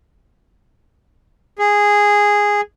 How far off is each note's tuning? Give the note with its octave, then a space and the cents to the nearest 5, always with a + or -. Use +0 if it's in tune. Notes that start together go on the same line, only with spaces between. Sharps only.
G#4 -10